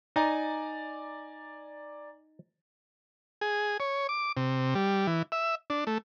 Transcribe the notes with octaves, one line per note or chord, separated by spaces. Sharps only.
D#4 D5 G#5 A#5
G#4
C#5
D6
C3
G3
E3
E5
D4
A3